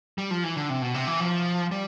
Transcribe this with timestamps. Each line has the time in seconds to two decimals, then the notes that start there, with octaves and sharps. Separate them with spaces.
0.18 G3
0.31 F3
0.44 E3
0.56 D3
0.70 C3
0.82 B2
0.94 C3
1.07 E3
1.20 F3
1.71 G3